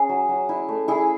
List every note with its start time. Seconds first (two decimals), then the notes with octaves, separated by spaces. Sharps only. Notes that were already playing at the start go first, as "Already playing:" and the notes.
Already playing: C#4 G#4
0.09 F#3
0.29 F#3
0.49 E4
0.69 A3
0.88 E4 G#4